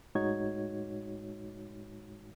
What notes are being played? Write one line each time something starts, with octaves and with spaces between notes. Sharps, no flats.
A2 G#3 D#4 F#4 C#5 G#6